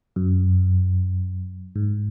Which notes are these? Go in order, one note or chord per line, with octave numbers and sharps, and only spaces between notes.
F#2
G#2